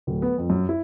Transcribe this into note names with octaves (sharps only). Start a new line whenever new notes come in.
D1
B3
F2
F#2
E4